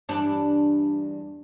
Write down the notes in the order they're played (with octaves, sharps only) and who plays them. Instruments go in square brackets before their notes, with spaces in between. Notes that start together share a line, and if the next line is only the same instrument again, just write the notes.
[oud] E2 G2 D4